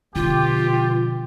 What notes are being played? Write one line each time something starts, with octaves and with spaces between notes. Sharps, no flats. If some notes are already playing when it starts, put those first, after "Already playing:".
B2 D3 F3 F4 G4